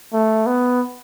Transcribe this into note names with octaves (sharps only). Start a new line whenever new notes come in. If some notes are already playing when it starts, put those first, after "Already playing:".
A3
B3